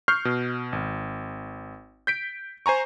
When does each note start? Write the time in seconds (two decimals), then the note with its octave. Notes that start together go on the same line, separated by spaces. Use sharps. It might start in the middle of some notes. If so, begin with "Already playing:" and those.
0.08 C#6 F6 G6 C7
0.25 B2
0.73 G#1
2.07 G6 B6 D7
2.66 C5 G#5 A#5 C#6